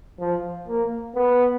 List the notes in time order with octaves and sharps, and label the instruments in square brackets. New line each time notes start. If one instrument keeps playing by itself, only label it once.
[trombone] F3
A#3
B3